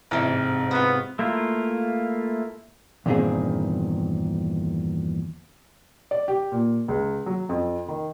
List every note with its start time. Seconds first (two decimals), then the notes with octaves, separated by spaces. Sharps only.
0.11 A1 G#2 C3
0.71 B3 F4 F#4
1.19 A3 A#3 E4 F4
3.06 E2 G2 A#2 D#3 C4 G#4
6.11 D5
6.28 G4
6.52 A#2
6.88 C#2
7.26 F#3
7.49 F2
7.88 D#3